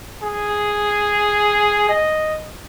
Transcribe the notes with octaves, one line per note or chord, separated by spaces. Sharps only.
G#4
D#5